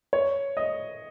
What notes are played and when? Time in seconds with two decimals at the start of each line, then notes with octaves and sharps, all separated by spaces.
0.13 C#5
0.57 D#5